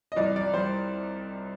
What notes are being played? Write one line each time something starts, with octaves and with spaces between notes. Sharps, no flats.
D#5
C2 D5
G3 D5
G3 C5